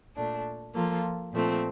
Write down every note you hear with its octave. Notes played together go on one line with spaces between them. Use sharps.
A#2 A3 D4
F3 A#3 F4 A4
A#2 F3 A3 C4